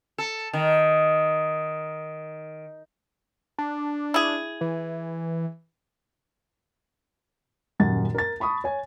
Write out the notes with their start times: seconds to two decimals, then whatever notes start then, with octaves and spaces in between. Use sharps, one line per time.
0.18 A4
0.53 D#3
3.58 D4
4.14 E4 G#4
4.61 E3
7.80 D#1 F#2 F#5 A6
8.15 A#4 A6
8.40 A5 B5 C#6 D#6
8.64 C#5 G#5